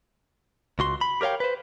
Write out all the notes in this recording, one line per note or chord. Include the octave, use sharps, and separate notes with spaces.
C#2 F#4 C6
B5
G4 A#4 C#5 F5 G5
B4 C5